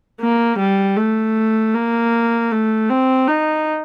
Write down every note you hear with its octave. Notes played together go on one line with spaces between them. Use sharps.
A#3
G3
A3
A#3
A3
C4
D#4